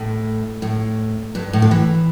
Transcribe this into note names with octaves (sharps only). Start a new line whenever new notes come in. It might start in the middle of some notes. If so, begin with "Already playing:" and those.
Already playing: A2
A2
G2
A2
D3
E3